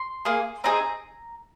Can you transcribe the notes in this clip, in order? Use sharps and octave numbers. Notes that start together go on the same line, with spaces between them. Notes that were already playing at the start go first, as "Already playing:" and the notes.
Already playing: C6
A#3 G#4
C4 D#4 G#4 A#5